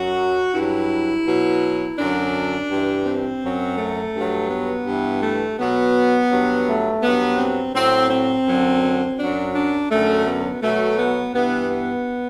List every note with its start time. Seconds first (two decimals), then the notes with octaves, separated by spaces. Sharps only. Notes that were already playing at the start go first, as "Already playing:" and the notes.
Already playing: F#2 F#3 F#4
0.55 G2 F#3 E4
1.26 B2 F#3
1.98 F#2 D3 F#3 D4
2.70 G2 E3
3.06 C4
3.43 F#2 F#3
3.78 A3
4.14 G2 F#3
4.51 B3
4.87 G2 E3
5.23 A3
5.59 B2 F#3 B3
6.31 G2 F#3
6.67 A3
7.03 G2 F#3 B3
7.38 C4
7.74 A2 F#3 C4
8.11 C4
8.47 F#2 D3 F#3
9.19 F#2 F#3 D4
9.55 D4
9.91 F#2 D3 F#3 A3
10.27 B3
10.63 B2 F#3 A3
10.99 B3
11.35 G2 E3 B3
11.71 B3